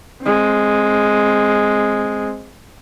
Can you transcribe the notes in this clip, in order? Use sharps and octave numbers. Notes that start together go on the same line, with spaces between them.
G#3 C4